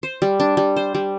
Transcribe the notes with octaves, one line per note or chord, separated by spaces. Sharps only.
C5
G3
D4
G3
C5
G3